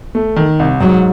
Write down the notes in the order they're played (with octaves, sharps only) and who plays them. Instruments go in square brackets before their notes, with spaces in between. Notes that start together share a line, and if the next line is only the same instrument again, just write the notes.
[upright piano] A3
D#3
C2
[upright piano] G#2 [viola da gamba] F#3